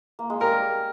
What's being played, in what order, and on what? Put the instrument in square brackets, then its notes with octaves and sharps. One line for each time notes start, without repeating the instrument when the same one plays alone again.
[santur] A#3
G#3
[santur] G3 [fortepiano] A#4